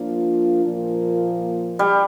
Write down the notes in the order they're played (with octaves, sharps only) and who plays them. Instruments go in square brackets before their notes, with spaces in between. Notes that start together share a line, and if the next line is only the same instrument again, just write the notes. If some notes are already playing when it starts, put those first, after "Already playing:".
Already playing: [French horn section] F3 A#3 D4 F4
A#2 F3 A#3
[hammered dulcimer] G3